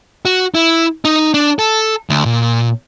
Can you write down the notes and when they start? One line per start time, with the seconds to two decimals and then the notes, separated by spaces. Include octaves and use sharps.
0.25 F#4
0.55 E4
1.05 D#4
1.34 D4
1.59 A4
2.10 D2
2.26 A#2